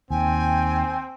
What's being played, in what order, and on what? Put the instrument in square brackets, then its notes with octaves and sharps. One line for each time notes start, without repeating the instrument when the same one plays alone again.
[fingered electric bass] D#2 [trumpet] C4 [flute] G5 [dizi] G#5